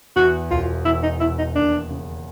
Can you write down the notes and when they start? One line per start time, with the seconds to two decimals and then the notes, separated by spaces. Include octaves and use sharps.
0.16 E2 F#4
0.51 E1 F4
0.85 E2 E4
1.03 D#4
1.20 E2 E4
1.39 D#4
1.55 D#2 D4
1.91 C#3